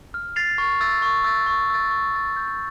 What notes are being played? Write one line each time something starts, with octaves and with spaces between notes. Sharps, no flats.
F6
A6 C7 F7
C#6
E6 A6
C#6
E6 A6
C#6
E6 A6
C#6
E6 A6
G6